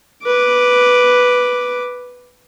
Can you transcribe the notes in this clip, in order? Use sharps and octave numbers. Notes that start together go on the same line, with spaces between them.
B4 D6